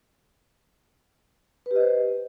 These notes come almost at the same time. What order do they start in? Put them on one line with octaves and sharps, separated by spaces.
B4 G4 D#5 C5